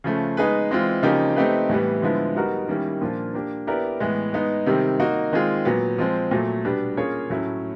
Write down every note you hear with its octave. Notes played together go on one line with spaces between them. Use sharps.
C#3 F3 A3
G#3 B3 D#4 G#4 B4
E3 G#3 C4 F4
C#3 F3 A#3 D#4 G4
A3 C4 D#4 G4 B4
A2 E3 G3 B3
D3 F3 G#3 B3 E4
G3 B3 D#4 F#4 A#4
D#3 G3 A#3 C#4 E4
A#2 F3 A#3 D4 F4
A#3 D4 G4
B3 E4 G4 A#4 D5
A2 E3 G#3 B3
G#3 B3 D#4
C3 D#3 G3 C4
A#3 D#4 F#4
D#3 G#3 C4 F4 G#4
A#2 F#3 B3
F3 G#3 C4
A#2 F#3 A3
B2 G3 B3 D4 G4
A#3 C#4 F4 G#4 C#5
A2 F#3 A3 C#4 E4